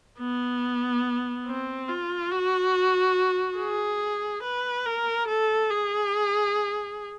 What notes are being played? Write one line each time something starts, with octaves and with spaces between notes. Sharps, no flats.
B3
C4
F4
F#4
G#4
B4
A#4
A4
G#4